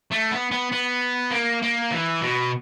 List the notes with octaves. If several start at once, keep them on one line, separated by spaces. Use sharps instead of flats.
A3
B3
B3
B3
A#3
A#3
E3
B2